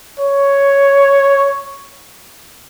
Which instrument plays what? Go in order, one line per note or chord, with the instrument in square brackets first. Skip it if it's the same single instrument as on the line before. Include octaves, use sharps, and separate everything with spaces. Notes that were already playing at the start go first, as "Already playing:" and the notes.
[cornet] C#5